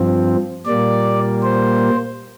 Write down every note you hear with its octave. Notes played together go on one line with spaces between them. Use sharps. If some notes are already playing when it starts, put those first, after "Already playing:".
Already playing: G2 F3 C4
A#2 G3 A#3 D5
C5